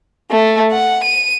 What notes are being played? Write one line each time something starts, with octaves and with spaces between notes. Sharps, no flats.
A3
F#5
D#7